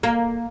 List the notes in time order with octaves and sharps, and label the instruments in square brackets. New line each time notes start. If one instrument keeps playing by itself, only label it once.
[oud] A#3